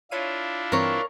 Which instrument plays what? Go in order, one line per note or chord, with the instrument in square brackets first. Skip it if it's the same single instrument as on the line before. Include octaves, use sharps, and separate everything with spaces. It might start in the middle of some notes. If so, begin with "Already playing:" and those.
[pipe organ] D4 E4 F4 [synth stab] C#5 F5 D#7
[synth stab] G2 E3 C4 [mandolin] A#4 C#5